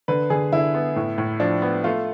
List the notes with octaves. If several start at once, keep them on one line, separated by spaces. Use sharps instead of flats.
D3 B4
D3 G#4
D3 E4
B3
A2
A2
F3 D4
B3
A3 F4